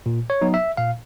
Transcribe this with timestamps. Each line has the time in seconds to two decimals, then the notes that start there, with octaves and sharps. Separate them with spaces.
0.06 A#2
0.30 C#5
0.41 F#3 B3 D#4
0.54 E5
0.77 A#2 F5